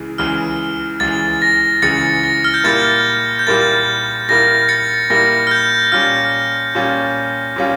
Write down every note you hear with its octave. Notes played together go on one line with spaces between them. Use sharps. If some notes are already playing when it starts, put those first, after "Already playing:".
Already playing: C#2 C#3 E3
C#2 C#3 E3 F6
C#2 C#3 E3 A6
A#6
C#2 C#3 E3 A6 C#7
A#6
F6
G6
A#2 G3 A#3 E4 A#4 A6
G6
A#2 G3 A#3 E4 A#4 A6
A#2 G3 A#3 E4 A#4 A#6
A6 C#7
A#2 G3 A#3 E4 A#4 A#6
F6
G6
A#2 G3 C#4 F4 F6
A#2 G3 C#4 F4
A#2 G3 C#4 F4